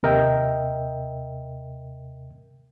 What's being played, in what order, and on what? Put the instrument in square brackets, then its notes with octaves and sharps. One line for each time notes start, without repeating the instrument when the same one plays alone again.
[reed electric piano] D#2 C3 A#4 D#5 E5 G5